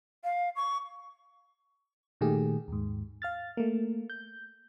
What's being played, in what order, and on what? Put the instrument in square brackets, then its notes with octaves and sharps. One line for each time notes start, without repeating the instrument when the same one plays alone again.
[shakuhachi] F5
C#6
[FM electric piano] A#2 D#3 A3 G4 G#4
D#2 G#2
F5 F6 A6
A3 A#3
G6